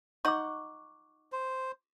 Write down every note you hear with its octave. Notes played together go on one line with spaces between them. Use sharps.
D#4 F#5 C#6 D6
C5